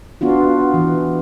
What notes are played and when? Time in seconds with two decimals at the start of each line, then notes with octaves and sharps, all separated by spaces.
0.21 B3 D4 F4 F#4
0.74 E3